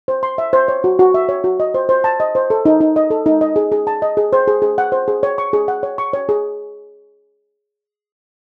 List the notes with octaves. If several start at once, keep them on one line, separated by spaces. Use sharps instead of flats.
C5
C6
E5
C5
C#5
F#4
F#4
E5
C#5
F#4
D#5
C5
C5
A5
D#5
C5
A4
D#4
D#4
D#5
A4
D#4
D#5
G#4
G#4
A5
D#5
G#4
C5
G#4
G#4
F#5
C5
G#4
C#5
C#6
G#4
F#5
C#5
C#6
C#5
G#4